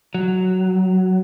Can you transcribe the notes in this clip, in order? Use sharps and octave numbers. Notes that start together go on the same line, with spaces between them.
F#3